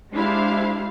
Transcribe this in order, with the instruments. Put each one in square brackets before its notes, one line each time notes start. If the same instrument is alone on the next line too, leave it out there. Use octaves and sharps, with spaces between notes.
[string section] G#3 D4 E4 G4 C5 F5